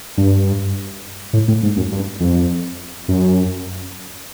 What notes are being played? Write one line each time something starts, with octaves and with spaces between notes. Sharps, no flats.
G2
A2
A2
G#2
F#2
G2
F2
F#2